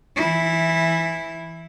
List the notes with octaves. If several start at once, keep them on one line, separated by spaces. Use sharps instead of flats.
E3 E4